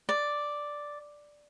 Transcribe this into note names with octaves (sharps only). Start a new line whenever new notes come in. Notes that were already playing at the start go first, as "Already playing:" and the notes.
D5